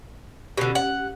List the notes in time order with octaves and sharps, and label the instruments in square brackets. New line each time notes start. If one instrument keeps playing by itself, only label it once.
[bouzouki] B2 D3 [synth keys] C#4 G4
[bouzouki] F#5